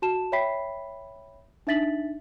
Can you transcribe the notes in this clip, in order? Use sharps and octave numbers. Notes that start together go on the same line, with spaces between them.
F#4 A5 E7
C#5 E5 G5 B5 B6 C7
D4 D#4 E5 A6 B6 F#7